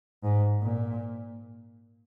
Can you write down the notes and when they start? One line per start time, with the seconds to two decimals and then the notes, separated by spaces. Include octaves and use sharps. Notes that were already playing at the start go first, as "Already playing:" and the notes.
0.24 G#2
0.63 A#2